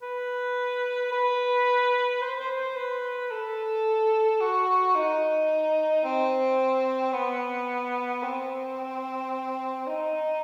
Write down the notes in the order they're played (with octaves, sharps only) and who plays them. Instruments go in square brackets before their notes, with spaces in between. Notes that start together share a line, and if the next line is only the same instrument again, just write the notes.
[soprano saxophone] B4
B4
C5
C5
C5
B4
A4
F#4
D#4
C4
B3
C4
D#4